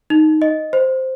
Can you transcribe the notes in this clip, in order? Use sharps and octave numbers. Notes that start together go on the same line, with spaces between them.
D#4
D#5
C5